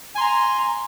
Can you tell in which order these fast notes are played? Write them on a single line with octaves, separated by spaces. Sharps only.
G#5 C6 A#5